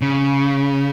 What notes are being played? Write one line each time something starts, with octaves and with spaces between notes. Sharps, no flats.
C#3